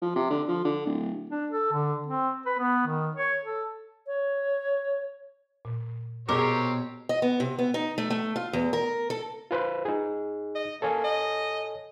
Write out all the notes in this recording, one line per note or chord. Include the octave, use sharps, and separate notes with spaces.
F3
C3
D3
F3
D3
D1
D4
A4
D3
C4
B4
B3
D#3
C#5
A4
C#5
A#2
B2 C4 G4 G#4 A#4 C#5 A#5 D6
D#5
B3
C3
B3
D#4
A3
A3
F4
E2
A#4
A4
F4 B4 C5
D#4 G#4
D#5
A#3 A4 C#5 G#5
D#5